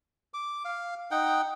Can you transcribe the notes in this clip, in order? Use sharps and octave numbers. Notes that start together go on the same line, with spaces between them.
D6
F5
D#4 F#5 G5